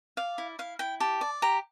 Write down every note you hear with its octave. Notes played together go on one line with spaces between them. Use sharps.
D5 F5
E4
E4 F5
E4 G5
G4 A5
D5
G4 A#5